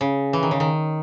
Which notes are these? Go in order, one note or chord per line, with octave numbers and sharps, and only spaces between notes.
C#3
E3
D#3
C#3
D#3